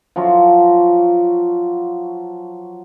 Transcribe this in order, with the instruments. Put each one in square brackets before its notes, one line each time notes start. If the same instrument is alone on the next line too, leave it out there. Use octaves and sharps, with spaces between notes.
[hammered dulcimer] F3 F#3 F4 F#4